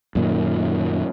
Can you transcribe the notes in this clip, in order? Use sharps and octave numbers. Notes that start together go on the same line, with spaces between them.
F#2 A#2 D#3